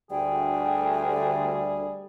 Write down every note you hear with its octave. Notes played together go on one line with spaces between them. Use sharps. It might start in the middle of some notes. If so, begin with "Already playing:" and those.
D2 G3 G#4 G5
G3